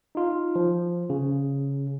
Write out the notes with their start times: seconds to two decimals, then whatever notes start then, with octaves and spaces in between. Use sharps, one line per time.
0.15 D#4 F4
0.55 F3
1.10 C#3